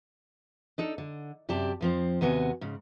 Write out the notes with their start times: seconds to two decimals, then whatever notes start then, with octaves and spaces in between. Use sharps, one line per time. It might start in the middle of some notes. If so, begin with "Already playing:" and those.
0.78 D4 D#4 A4
0.98 D3
1.49 F#2 C3 G4 D5 A5
1.81 F2 F3 C4
2.21 D#2 C3 B3 F#4 G#5
2.61 G#2 C#3